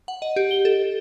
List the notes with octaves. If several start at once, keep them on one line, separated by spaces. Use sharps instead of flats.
F#5
D#5
G4
G7
A4